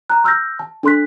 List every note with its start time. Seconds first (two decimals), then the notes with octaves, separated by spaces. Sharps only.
0.10 A#5 F#6
0.24 C6 E6 F6 G6 A#6
0.59 A5
0.83 D4 A4 C6 F#6 B6